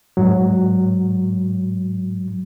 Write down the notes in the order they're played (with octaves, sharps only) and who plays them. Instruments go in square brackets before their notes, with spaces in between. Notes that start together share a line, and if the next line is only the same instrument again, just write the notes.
[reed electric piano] G#2 F#3